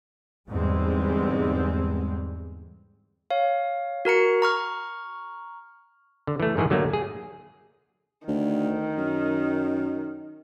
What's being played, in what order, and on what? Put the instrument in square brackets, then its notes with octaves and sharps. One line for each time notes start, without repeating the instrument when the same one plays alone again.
[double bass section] E2 G#2 D3 G3 G#3 C4
[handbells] C#5 F5
F#4 A#4 A#5 C#7
A#5 C#6 F6
[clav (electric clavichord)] D3
E3 A3
G#2 D#3 E3 G#4
D3 F#3 A3 A#3
G#4
[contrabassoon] D2 [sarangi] D#3
[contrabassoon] F#2